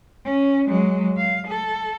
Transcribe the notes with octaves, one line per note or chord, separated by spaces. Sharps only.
C#4
F#3 G#3
F5
A4